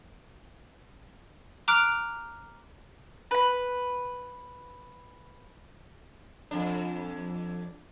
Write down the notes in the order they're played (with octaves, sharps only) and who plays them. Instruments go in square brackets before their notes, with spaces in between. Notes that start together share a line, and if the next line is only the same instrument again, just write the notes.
[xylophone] A#5 D6 F6 F#6 D7 F7
[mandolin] B4 B5
[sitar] F2 D4